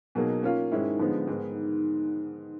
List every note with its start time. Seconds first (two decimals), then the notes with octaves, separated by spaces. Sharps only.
0.15 B2 F#3 A#3 D#4 G#4
0.43 A#3 C#4 F4
0.72 G#2 D#3 G#3 C#4 E4
0.99 D3 F3 G#3 B3 D#4
1.27 G#2 D#3 G#3 B3